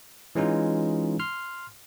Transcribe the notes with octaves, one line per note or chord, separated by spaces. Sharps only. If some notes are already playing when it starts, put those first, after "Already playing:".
E3 G#3 C#4 D#4 F4
C6 F6